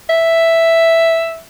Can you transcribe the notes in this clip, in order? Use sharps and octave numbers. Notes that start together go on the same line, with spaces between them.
E5